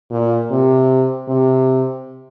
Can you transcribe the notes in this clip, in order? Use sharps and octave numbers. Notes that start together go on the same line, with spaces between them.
A#2
C3
C3